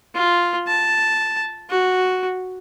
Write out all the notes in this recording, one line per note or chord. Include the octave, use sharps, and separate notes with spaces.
F4
A5
F#4